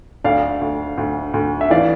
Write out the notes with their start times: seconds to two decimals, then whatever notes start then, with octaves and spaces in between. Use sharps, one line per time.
0.24 D2 D5 F5
0.61 D2
0.98 D2
1.34 D2
1.61 E5
1.70 E3 D5 F5